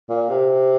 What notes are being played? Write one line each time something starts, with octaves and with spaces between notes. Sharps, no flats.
A#2
C3